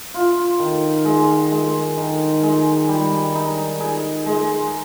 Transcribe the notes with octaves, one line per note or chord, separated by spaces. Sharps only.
F4
D#3
G#3
G#3
D#3
G#3
G3
D#4
G#4
G#3